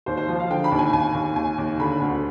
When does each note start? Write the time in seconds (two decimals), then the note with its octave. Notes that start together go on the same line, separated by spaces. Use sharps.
0.06 D#2 C5
0.17 C5
0.29 F3
0.40 F5
0.50 D3 G5
0.64 B5
0.72 D#2
0.79 G#5
0.93 D#2 G#5
1.14 D#2
1.36 D#2 G#5
1.58 D#2
1.80 D3 B5
2.02 D2